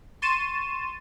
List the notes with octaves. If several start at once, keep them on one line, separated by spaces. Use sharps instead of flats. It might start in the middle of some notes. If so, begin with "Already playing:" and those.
C6 C#6 A6 D#7 E7